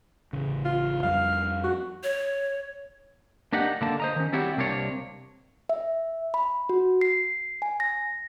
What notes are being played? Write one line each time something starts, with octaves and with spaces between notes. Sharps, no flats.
A1 C#3
F4
F2 G3 F5
F#4
C#5
A#3 D4 D#4 G4 F#5
D3 A#3 A5
C5 D#5 A#5
D#3 C#4
G3 C4 E4 F#4 G4 C#5
C2 C3 A#3 D4 E4 C#5
E5
B5
F#4
C7
G#5
A#6